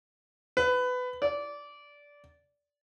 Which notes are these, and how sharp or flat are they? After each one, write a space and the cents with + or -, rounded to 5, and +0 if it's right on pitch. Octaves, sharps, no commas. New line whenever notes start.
B4 +20
D5 -15